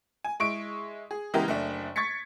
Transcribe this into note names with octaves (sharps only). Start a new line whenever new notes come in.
G#5
G#3 E4 C#6 D7
G#4
C#3 E3 G#3 B3 G4 A#4
F#1 A3 D4
C#6 G#6 A6 B6 C#7